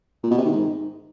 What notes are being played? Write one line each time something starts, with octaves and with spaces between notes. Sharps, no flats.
A#2
B2
C3
D#3
G#2